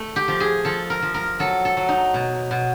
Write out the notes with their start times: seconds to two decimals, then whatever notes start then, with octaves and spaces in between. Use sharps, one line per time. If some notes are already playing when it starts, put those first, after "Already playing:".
Already playing: A3
0.16 G4
0.28 F3
0.40 G#4
0.65 F3 A4
0.90 A#4
1.02 F3
1.14 A#4
1.39 F#3 A4
1.65 A4
1.77 F#3
1.89 D#4
2.14 B2
2.51 B2